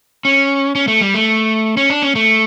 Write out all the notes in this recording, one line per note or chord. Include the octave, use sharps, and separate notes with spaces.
C#4
C#4
A3
G3
A3
C#4
D4
C#4
A3